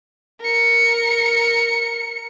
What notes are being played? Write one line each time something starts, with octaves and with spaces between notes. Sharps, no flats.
A#4 C#7